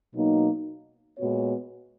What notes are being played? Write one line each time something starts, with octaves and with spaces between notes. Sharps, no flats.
B2 F#3 A#3 D#4
A#2 G#3 B3 F#4 C#5